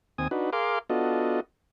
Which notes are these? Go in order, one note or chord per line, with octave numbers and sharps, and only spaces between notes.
D#2 C4 G#5 D#6
D4 D#4 F#4 B4
G#4 A#4 F5 C6 D6
B3 D4 F4 F#4 A4 D#5